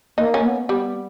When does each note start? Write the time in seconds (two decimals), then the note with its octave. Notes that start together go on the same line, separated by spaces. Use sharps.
0.17 A#3 D#4
0.34 C#4
0.44 B3
0.69 G3 B3